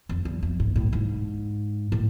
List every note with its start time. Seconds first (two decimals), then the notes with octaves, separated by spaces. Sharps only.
0.09 F2
0.25 E2
0.43 F2
0.60 G#2
0.76 A2
0.92 G#2
1.92 A2